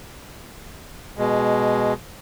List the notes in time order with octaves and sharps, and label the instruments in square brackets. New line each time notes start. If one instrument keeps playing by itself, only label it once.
[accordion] B2 G#3